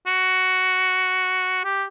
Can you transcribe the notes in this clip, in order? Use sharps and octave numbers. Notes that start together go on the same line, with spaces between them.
F#4
G4